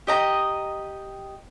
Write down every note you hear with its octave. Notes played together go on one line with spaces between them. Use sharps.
G4 D#5 A#5